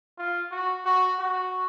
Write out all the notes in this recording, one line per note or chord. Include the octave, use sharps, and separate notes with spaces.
F4
F#4
F#4
F#4